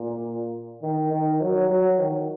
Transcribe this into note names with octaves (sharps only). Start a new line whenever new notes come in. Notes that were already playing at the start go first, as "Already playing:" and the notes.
Already playing: A#2
D#3
D#3
F#3
F#3
D#3